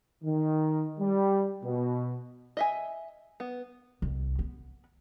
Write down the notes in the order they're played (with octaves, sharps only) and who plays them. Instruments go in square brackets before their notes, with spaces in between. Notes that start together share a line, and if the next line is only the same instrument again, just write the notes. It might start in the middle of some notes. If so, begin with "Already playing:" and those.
[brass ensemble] D#3
G3
B2
[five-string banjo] D#5 E5 G#5
B3
[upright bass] C2
B3